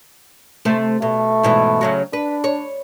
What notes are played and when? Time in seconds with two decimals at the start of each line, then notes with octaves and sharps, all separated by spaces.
0.65 C3 A3 C5
1.02 B2 A3
1.43 G#2 B2 E3
1.81 C#3 F#3 F#4
2.13 D4 B4
2.44 C#5